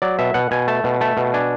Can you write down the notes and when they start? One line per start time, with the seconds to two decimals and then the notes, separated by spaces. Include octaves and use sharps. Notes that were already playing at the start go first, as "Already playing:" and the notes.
0.02 F#3 D5
0.19 B2 E5
0.34 B2 F#5
0.51 B2 G#5
0.68 A3 A5
0.84 B2
1.01 A3 A5
1.17 B2
1.34 D4 G#5